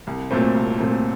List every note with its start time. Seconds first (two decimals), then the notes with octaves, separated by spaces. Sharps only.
0.07 C2
0.31 A#2 F#3 A3 C4
0.55 C2
0.78 A#2 F#3 A3 C4